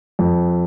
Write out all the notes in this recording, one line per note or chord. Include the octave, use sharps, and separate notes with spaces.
F2